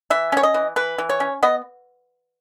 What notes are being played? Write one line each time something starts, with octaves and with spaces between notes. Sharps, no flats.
E3 E5
C#4 C#5
D#5
E3
E3 B4
E3
C#5
C#4
B3 D#5